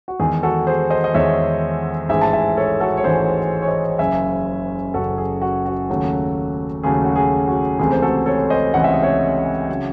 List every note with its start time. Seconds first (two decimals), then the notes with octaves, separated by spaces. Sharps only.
0.08 F#4
0.20 E2 D#3 G#3 G#4
0.43 F#4 A4
0.67 G#4 C5
0.90 C5 D#5
1.04 D#5
1.14 E2 D#3 G#3 C#5 E5
2.09 A1 G#2 E3 G#3 E5 G#5
2.21 A5
2.33 E5 G#5
2.57 A4 C#5
2.80 F#4 A4
2.97 C#5
3.04 A1 G#2 E3 G#3 G#4 C5
3.62 C#5
3.68 C5 D#5
3.99 F#1 F#2 C#3 E5 G#5
4.94 F#1 F#2 C#3 F#4 A4
5.18 G#4
5.42 F#4
5.66 F#4
5.89 D#2 C#3 F#3 A3
6.83 D#2 C#3 F#3 A3 G#4
7.05 F#4
7.16 G#4
7.48 F#4
7.79 C#2 C3 E3 A3 G#4
7.91 C5
8.02 F#4 A4
8.26 A4 C#5
8.39 C#5
8.50 C5 D#5
8.74 C#2 C3 E3 A3 F#5
8.84 E5
8.93 D#5
9.03 C#5 E5
9.69 C#3 F#3